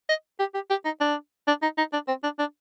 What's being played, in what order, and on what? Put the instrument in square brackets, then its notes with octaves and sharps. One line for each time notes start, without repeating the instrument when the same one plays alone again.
[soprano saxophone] D#5
G4
G4
G4
D#4
D4
D4
D#4
D#4
D4
C4
D4
D4